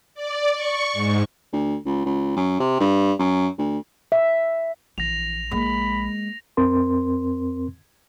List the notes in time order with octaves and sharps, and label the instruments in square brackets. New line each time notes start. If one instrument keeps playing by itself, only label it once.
[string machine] D5
C#6
G#2
[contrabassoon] D2
C#2
C#2
F#2
C3
G2
F#2
D2
[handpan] E5
[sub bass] A#1 [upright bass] E3 [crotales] A#6 F7
[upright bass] G#3 A#3 [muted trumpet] B5
[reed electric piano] F2 C4 A#4 C6